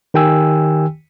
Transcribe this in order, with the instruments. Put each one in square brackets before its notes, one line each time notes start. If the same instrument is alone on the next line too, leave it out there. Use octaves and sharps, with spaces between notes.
[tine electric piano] D#3 G4 G5 G#5 E6